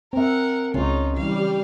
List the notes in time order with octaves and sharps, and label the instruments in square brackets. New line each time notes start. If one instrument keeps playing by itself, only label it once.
[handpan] C4 E5 [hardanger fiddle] A#4 F#5
[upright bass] C#2 [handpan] C#3 C#4 C#5 [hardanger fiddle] D#4 F4
[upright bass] E3 E4 [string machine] G3 [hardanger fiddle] F5